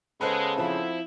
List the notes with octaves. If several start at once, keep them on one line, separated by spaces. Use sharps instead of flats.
C#3 G#3 B3 A4 B4 C5 F#6
F3 C4 E4